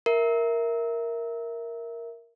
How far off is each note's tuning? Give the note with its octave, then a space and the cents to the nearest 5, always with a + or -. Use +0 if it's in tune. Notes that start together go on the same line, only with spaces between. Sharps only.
A#4 +0 E5 +0